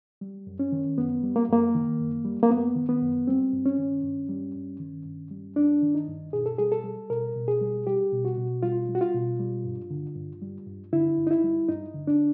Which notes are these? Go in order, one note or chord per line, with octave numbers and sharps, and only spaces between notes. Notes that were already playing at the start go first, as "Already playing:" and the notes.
G3
F#2
C#4
D#3
F#2 B3
G3
A#3
F#2 A#3
D#3
F#2
G3
A#3
F#2 B3
D#3
B3
F#2
G3 C4
G2
C#4
D#3
G2
G3
G2
D#3
G2
G3
G2 D4
D#3
D#4
G2
B2 G#4
A4
G3 G#4
A4
G3
B2 A#4
B2
G#4
G3
G3 G4
B2
F#4
B2
G3 F4
G3
F#4
F4
B2
G3
G2
D3
G2
G3
G2
D3 E4
G2
D#4
E4
G3
G2 D#4
D3
D4